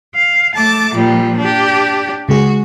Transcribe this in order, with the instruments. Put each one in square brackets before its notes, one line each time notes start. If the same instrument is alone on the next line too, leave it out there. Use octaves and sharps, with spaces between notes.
[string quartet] F5
A3 A5 D6
A#2 F3 G3
D4 G4
[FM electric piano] C#3 G#3 G#4 [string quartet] F#4